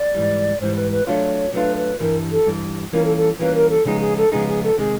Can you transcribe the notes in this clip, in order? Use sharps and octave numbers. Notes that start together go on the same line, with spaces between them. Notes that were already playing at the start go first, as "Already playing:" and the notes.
Already playing: D5
G#2 E3 G3
G#2 E3 G3 C5
B4
B4
F#3 A3 D4 F4 C#5
F#3 A3 D4 F4 B4
B4
G2 E3 G3 A#4
A4
G2 E3 G3
E3 G3 A#3 C#4 F4 A#4
A4
A4
E3 G3 A#3 C#4 F4 B4
A#4
A4
C#3 F3 G#3 B3 D#4 G#4
G#4
A4
C#3 F3 G#3 B3 D#4 G#4
G#4
A4
C3 D#3 G#3 G#4